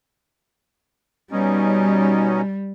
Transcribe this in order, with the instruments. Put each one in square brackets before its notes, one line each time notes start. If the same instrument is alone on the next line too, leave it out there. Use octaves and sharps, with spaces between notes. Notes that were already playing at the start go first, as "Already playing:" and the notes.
[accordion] B2 C#4 D#4 [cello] G3